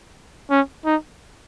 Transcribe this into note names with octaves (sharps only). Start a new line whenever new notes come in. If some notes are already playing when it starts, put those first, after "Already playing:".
C#4
D#4